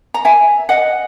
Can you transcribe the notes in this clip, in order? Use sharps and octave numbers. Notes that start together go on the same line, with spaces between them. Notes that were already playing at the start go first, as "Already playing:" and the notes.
A#5
E5 G#5
D#5 F#5